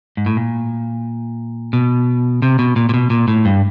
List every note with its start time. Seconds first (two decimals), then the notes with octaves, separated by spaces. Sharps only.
0.17 G#2
0.26 A2
0.37 A#2
1.73 B2
2.42 C3
2.59 B2
2.76 A#2
2.89 A#2
2.94 B2
3.10 A#2
3.28 A2
3.45 G2